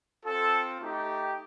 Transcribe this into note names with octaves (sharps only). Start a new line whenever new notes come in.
C4 F4 A4
A3 D#4 G4